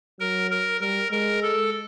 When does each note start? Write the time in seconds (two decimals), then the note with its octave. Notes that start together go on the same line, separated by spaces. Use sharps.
0.20 F#3 A#4
0.51 A#4
0.81 G3 A#4
1.11 G#3 A#4
1.43 A4